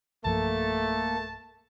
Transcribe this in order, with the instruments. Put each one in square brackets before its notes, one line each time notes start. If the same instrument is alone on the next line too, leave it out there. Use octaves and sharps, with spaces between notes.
[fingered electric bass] B1 G2 F3 [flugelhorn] A3 [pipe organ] A#3 A4 [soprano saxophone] A5